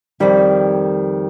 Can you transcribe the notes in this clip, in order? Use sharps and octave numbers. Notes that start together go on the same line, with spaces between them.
F2 D#3 G3